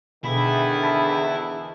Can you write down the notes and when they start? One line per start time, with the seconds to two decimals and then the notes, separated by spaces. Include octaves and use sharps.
0.24 E2 B2 D3 D#3 E4 G#4 B5
0.83 A5 B5 E6